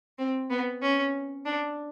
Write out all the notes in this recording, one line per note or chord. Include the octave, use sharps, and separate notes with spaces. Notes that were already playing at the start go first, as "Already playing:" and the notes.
C4
B3
C#4
D4